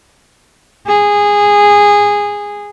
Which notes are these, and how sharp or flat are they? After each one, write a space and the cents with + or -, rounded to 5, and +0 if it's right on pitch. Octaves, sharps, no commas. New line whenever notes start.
G#4 -15